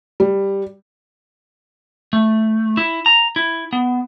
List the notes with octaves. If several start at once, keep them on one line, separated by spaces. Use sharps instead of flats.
G3
A3
E4
A#5
E4
B3